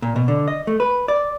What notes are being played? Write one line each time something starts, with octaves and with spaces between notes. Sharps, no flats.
A#2
B2
D3
D#5
A3
B4
D5